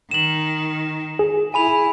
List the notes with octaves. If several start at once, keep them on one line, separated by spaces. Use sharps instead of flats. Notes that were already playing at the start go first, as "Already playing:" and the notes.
D#3 E7 F#7
G#4
E4 G#5 B5 F7